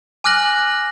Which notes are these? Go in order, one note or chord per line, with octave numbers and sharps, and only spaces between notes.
G#5 D6 F6 F#6 A#6 F#7